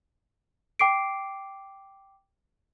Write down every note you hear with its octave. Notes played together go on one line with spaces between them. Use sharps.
G5 D6 C7 D7